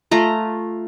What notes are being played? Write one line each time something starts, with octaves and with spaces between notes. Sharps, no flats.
A3 F4 A#5